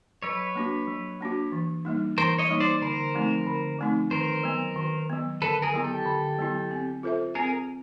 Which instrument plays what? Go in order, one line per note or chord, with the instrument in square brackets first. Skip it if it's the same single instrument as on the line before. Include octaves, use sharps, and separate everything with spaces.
[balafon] F#3 [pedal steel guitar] B4 C#5
[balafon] A#3 D4 F#4
F#3
A#3 D4 F#4
E3
G3 A#3 D#4
[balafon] E3 [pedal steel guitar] A#4 C5
[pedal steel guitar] C#5 D#5
[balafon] G3 A#3 D#4
[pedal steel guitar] C5 D5
[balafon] D3 [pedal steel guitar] A#4 C5
[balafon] F3 A3 C4 D#4
D3
F3 A3 C4 D#4
[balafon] D#3 [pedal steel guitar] A#4 C5
[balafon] F#3 B3
D#3
F#3 B3
[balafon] D3 [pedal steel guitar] A4 B4
[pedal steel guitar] G#4 A#4
[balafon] F#3 B3 E4
[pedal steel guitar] G4 A4
[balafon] D3
F#3 B3 E4
C4
F4 A4 C5 E5
[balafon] C4 [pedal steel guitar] G#4 A#4